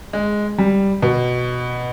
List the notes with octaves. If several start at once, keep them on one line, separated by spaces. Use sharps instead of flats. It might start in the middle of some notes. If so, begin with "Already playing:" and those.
G#3
G3
B2